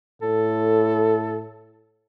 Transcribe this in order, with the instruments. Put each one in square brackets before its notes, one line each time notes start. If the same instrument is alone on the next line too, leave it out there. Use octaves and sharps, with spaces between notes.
[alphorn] A2 [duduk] A4